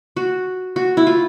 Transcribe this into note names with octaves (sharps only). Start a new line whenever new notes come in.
F#4
F#4
E4
F4